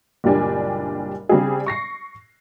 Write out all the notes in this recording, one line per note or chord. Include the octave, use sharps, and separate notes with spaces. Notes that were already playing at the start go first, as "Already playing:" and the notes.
F#1 A#2 G3 D4 G4 G#5
C#3 G3 C4 D4 G#4
C#6 A#6 C7